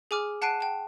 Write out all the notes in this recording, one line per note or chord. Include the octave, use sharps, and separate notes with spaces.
G#4 G#5 D6 F6
F#5 A5 F#6 C7 D7 D#7
G5 A5